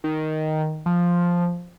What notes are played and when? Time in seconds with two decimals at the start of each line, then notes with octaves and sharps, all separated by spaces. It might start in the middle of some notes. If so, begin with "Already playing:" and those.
0.04 D#3
0.86 F3